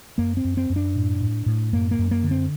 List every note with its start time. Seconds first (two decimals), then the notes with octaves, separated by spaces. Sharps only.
0.18 F#2 A#3
0.37 C4
0.45 F#2
0.57 C4
0.70 F#2
0.76 D4
0.96 A2
1.20 A2
1.46 A2
1.73 F#2 A#3
1.91 A#3
1.99 F#2
2.11 A#3
2.23 D3
2.31 C4